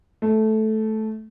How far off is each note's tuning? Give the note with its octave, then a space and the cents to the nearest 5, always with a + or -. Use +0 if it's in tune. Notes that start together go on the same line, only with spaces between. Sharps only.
A3 -10